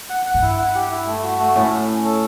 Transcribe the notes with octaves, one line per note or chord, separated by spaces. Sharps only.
F#5
F#5
G2
E4
F#5
G4
E4
A3
F#4
A3
A2 C#4
C#4
C#4
A4